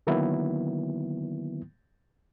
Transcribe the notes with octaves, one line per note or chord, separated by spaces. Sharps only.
D3 D#3 F#3 A#3 B3 E4